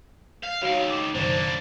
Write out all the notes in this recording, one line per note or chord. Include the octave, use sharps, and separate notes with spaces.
F5
C#2 D#3 F#4 C#5 F5
D6 E7
F#1 B1 D#3 A#3 D4 C5